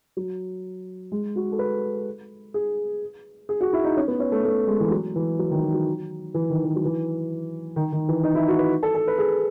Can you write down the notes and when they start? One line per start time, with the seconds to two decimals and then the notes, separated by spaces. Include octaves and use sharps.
0.17 F#3
1.12 G#3
1.36 F#4
1.52 A4
1.59 B4
2.54 G#4
3.49 G#4
3.61 F#4
3.73 E4
3.84 D#4
3.97 C#4
4.08 B3
4.20 C#4
4.32 A3
4.45 A3
4.67 G#3
4.80 E3
4.91 F#3
5.16 E3
5.39 F#3
5.51 D#3
5.63 E3
5.74 F#3
6.34 E3
6.50 D#3
6.65 E3
6.76 F#3
6.85 E3
7.76 D#3
7.92 D#3
8.09 E3
8.24 D#4
8.35 E4
8.48 F#4
8.59 B4
8.83 A4
8.95 A4
9.07 B4
9.18 G#4